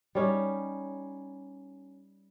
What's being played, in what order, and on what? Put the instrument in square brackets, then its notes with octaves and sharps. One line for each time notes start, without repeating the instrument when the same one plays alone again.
[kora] G3 C#4 D#4